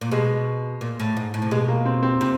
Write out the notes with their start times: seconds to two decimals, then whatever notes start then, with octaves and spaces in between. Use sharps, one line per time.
0.01 A#2
0.11 B2 G#3
0.81 A#2
0.99 A2
1.17 G#2
1.34 A2
1.42 C3
1.51 B2 G#3
1.68 A#3
1.85 C4
2.03 C4
2.21 C3 C4